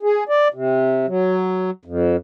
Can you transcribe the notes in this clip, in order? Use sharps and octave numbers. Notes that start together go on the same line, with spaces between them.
G#4
D5
C3
F#3
F2